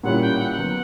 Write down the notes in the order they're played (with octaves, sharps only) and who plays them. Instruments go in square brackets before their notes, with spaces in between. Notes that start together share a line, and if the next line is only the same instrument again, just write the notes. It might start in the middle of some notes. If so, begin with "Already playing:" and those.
[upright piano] A#2 G3 C#4 E4 [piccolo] F#5
[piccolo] G5
F#5
[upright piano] F#3 B3